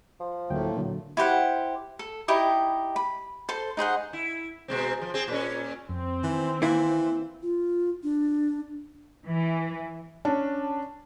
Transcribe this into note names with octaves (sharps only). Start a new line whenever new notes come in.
F3
D2 A2 F#3 A3 A#3 G5
A#2 D3 F#3
E4 G4 C5 F#5
A4
D#4 E4 G4 D#5
B5
A4 C5 C6
D#4 G#4 C5 F#5
E4
B2 G#3 C4
F3
C4 G#4
A#2 C#4
F2 C4
D#3 E3
E3 A#3 E4
F4
D4
E3
C#4 D4 A5